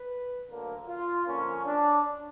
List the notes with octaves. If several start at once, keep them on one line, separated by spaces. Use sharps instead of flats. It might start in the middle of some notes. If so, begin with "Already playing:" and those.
Already playing: B4
D2 D3 F#3 A#3
F4
F2 D3 F3 A#3 C#4
D4